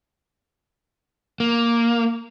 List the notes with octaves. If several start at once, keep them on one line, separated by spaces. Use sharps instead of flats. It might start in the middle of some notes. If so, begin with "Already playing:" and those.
A#3